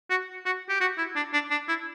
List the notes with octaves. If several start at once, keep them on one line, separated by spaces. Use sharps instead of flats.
F#4
F#4
G4
F#4
E4
D4
D4
D4
E4